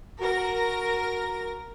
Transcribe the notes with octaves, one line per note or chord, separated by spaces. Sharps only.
F#4 A#4 A#6